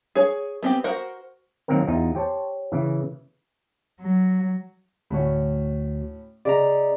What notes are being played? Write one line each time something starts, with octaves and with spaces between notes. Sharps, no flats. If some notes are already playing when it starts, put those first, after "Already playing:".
G#4 C#5
B3 C4 G4
F#4 A#4 C5 F#5
D#3 F#3 A#3 C4 A#4
E2 D#4 F4
G4 C5 C#5 A5
C#3 E3
F#3
D2 A2 C#4 F#4
C#3 D5 D#5 A#5